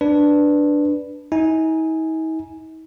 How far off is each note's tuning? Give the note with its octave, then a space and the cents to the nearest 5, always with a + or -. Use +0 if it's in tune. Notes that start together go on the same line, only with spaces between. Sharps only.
D4 +0 B4 +0
D#4 +45 G#5 +0